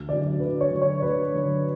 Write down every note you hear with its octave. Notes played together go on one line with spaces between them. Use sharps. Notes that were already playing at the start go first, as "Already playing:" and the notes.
Already playing: D2
D3 F#3 D5
D2 B4
C#5
D3 F#3
C#5
D2 B4
D3 F#3